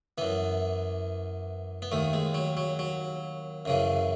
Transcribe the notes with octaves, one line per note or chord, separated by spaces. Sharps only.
F#2 E3 B3
B3
D#2 D#3 A3
G#3
F#3
F#3
F#3
F#2 C#3 E3